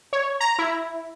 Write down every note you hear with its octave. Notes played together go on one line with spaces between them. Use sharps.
C#5
A#5
E4